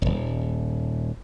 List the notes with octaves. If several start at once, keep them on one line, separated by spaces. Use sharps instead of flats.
D#1 G#1